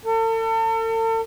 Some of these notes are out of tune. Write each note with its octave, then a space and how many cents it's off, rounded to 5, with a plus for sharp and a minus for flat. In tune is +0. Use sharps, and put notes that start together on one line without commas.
A4 +40